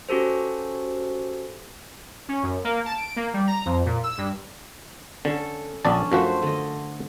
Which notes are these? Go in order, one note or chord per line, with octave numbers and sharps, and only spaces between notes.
C#4 F#4 G4 A4 C5
C#4
F#2
A#3
A5
D7
A#3
G3
A#5
F2
A#2
E6
G2
D3 C#4 A4
A#1 C#4 D4 D5 A5
F#2 F3 A3 F#4 C5
D3 D#5